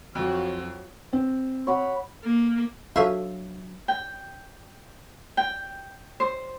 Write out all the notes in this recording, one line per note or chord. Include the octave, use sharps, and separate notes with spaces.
F2 F3 F#3 F#4
C4
C#5 F#5 B5
A#3
F#3 D4 F4 F#4 A4 C#5 E5 F5
G5
G5
C5